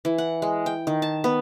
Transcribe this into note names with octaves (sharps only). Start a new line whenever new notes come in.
E3
F#5
G#3
G5
D#3
A5
B3